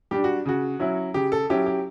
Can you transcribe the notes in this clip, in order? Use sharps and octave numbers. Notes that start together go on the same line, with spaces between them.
G3 D4 G4
F#4
C#3 F#4
F#3 C#4 E4
C#3 G4
A4
F#3 C#4 E4 G4
G4